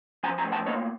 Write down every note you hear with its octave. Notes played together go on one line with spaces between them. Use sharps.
F3 G#5 A#5
G#5 A#5
A2
G5 A5
A#3 C#5 D#5